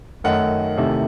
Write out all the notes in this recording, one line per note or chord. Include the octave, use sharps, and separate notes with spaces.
F#2 D#3 A3 D#4 F#5
E2 C3 D#3 A3 E4